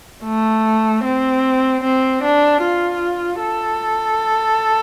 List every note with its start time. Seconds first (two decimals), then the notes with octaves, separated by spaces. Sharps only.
0.25 A3
1.05 C4
1.84 C4
2.23 D4
2.63 F4
3.41 A4